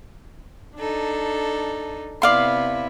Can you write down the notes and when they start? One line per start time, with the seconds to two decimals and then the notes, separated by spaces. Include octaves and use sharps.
0.78 D4 D#4 A4
2.22 C3 B3 E4 D5 F5 C6